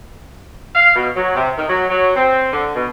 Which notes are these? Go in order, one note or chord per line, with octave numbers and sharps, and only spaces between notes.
F5
B2
F#3
C3
D#3
F#3
F#3
C4
D3
B2